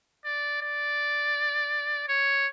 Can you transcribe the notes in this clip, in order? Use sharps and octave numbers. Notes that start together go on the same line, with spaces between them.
D5
D5
C#5